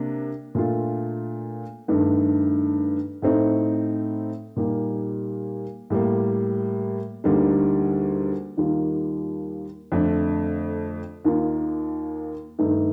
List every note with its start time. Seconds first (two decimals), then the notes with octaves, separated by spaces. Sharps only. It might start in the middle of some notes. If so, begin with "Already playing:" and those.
Already playing: C3 A#3 D4
0.55 A#2 A3 D4 F4
1.88 G2 D#3 A3 D4
3.22 A2 A3 C4 D#4
4.56 A#2 G3 A#3 D#4 G4
5.90 A2 G3 A#3
7.24 D2 D3 G3 A#3 D#4
8.57 D#2 D#3 G3 A#3 F4
9.92 F2 D3 A3 D4
11.25 D#2 D#3 A#3 F4
12.59 G2 D#3 A3 D#4